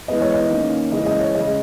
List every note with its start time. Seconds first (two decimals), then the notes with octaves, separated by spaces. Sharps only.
0.08 E3 G#3 B3 D#5
0.21 C#5
0.34 D#5
0.50 D#3 A#3 C#4
0.92 C#3 E3 G#3 C#4 D#5
1.06 D#5
1.20 C#5
1.34 C#3 G#3 C#4 D#5